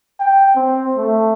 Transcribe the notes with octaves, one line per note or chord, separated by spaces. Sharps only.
G5
C4
A3